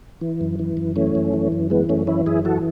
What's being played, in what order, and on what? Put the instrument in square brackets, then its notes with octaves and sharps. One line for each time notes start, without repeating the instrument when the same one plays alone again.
[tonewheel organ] E3
F#2
E3
F#2
E3 A3 C#4
F#2
E3
F#2
E3 G#3 B3
F#2 A3 C#4
E3 C#4 E4
F#2 E4 G#4
E3 F#4 A4